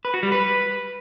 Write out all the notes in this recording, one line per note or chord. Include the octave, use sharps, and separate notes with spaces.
B4
F#4
G3
B4